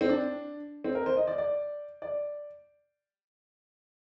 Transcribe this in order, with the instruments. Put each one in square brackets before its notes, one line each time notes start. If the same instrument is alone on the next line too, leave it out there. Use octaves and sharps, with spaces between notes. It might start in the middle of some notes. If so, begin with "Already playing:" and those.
[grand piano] C4
D4
C4
A#4
C5
D#5
D5
D5
D5